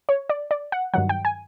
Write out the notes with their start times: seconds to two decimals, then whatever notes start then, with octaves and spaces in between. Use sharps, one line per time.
0.09 C#5
0.30 D5
0.51 D5
0.72 F#5
0.94 G2 D#3 F#3 F#5
1.09 G5
1.25 G#5